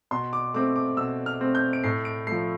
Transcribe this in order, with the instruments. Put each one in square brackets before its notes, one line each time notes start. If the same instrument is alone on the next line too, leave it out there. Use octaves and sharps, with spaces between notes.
[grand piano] B2 C6
D6
A3 C4 D6
D6
B2 E6
F6
A3 C4
G6
D7
A2 C7
D7
F3 A3 C7